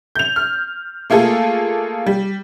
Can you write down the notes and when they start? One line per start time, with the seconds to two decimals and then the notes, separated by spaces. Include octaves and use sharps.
0.15 G6 F7
0.36 F6
1.10 A3 A#3 F4 G#4 A4
2.06 G3